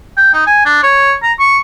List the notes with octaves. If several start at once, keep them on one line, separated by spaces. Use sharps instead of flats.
G5
D#4
G#5
D4
C#5
A#5
C#6